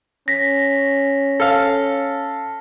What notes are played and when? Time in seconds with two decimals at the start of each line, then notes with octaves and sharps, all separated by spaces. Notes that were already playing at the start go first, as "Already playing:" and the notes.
0.28 C#4 A#6 B6
1.40 A4 F5